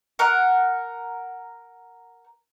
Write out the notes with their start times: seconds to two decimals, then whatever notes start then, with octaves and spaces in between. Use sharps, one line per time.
0.19 A#4 F#5